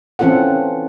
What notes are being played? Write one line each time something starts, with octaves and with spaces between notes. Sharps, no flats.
E3 C4 C#4 F4 A4 F#5